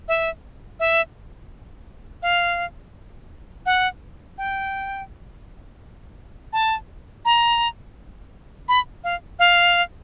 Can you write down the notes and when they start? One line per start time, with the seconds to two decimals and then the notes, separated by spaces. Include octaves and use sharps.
0.08 E5
0.79 E5
2.22 F5
3.66 F#5
4.38 G5
6.53 A5
7.25 A#5
8.68 B5
9.04 F5
9.39 F5